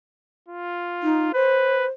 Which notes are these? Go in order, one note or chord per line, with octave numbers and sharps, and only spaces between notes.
F4
D#4
B4 C5